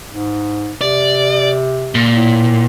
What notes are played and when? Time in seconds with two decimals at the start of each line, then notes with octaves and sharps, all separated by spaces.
0.12 G#2
0.81 C3 D5
1.95 A#2
2.15 A2